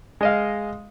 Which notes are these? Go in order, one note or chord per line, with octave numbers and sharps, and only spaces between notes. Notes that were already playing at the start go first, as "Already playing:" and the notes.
G#3 D#5 F5